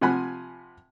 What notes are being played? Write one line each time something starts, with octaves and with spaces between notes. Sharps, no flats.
C3 F3 F#5 G#5 B5 F#6